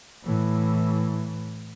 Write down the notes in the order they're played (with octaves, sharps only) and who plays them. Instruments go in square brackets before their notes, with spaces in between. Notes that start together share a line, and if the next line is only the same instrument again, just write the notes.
[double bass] A2 E3